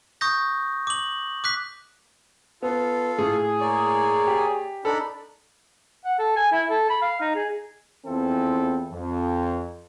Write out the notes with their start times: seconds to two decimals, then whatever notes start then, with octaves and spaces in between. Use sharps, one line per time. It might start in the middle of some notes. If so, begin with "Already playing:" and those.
0.21 C#6 D#6 G6 A#6
0.87 D6 F#7
1.44 D6 F#6 B6
2.62 B3 F4 A4
3.18 A2 G#4
3.60 A#3 C#5 D5
4.27 G4
4.85 D4 D#4 A4 B5
6.05 F#5
6.19 A4
6.36 G#5
6.52 E4
6.70 A4
6.90 B5
7.02 F5
7.20 D#4
7.35 G#4
8.06 E2 E3 C4 E4 F4 A4
8.92 F2